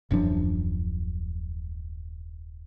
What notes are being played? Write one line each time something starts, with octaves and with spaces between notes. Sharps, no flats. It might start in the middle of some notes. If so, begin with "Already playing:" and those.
D#1 F#2 F3 D4